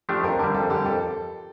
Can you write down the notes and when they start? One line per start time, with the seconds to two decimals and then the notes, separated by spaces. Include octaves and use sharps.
0.09 F3 A3 D4 G4
0.23 F2 A#4
0.39 D3 G3 A#4
0.54 F2 A4
0.70 D3 G3 G4
0.85 F2 A4